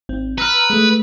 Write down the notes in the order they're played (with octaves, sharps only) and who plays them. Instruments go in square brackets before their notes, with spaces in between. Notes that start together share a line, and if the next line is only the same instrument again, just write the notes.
[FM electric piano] G#1 C4
[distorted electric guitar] B4 [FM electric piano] A#5 E6 F6
[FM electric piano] G#3 A3